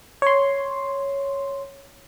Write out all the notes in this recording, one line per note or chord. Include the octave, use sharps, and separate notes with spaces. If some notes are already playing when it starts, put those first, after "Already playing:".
C#5 C6